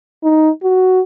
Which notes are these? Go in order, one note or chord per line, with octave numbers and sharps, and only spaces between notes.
D#4
F#4